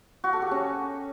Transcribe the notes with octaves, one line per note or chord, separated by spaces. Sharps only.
F#4
A4
G4
C#4